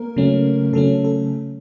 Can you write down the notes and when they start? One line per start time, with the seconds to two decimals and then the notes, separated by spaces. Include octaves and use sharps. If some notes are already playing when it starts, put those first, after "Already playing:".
Already playing: A#3 A#4
0.16 C#3 F#3 A3 C#4
0.73 C#3 F#3 A3 C#4 A4
1.04 A4